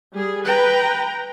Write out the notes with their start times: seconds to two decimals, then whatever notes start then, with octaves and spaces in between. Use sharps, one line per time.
0.14 G3 G#4
0.45 B4 G5 A#5